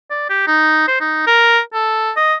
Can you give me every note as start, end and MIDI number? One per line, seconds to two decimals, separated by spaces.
0.10 0.29 74
0.29 0.45 67
0.47 0.85 63
0.88 0.99 72
1.01 1.26 63
1.27 1.60 70
1.73 2.11 69
2.17 2.35 75